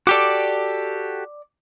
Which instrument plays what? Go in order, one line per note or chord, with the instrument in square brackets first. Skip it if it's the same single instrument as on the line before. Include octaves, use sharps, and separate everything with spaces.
[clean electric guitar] F#4 G4 A4 [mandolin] D5 D6